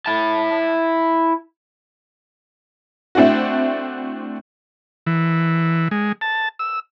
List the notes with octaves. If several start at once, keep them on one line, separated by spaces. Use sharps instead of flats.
E4 A5
A3 C4 D4 E4 F#4
E3
G#3
A5
E6